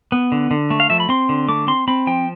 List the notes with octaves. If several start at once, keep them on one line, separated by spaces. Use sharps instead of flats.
B3
D3
D3
A3
F5
F3 E5
B5
C4 C6
D3
A3 D6
C4 C6
C4 B5
F3 G5